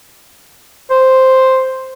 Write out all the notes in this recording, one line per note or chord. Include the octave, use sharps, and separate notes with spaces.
C5